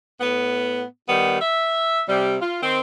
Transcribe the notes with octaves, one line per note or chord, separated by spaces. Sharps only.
A2 B3
D#3 G3 B3
E5
C3 G3
F4
D#3 C4